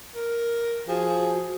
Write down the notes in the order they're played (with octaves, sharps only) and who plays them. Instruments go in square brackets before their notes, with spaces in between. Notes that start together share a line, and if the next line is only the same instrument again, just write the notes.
[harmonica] A#4
[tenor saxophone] F3 [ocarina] F#4 [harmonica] G#4